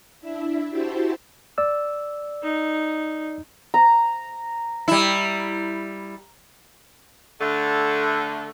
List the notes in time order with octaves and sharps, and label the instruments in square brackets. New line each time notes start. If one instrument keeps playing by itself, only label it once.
[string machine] D4 E4 E5
E4 F#4 G4 C5 A5
[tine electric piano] D5 E6
[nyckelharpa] D#4
[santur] A#5
[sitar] G3 E4
[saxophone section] D3 A3